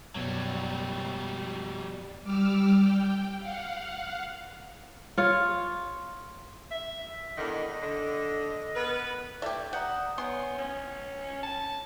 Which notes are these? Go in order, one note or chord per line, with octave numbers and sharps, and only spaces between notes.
F#2 B2 F#3 G3
G3 D6 E6 F6
G5
F5 F#5
F4 C#5
E5
E2 D3 D#3 D#5
D3
B3 A#4 B4
A3 G4 D5
F#5 A#5 D#6 G6
B3 C#5 G#5 C6
C#4
A5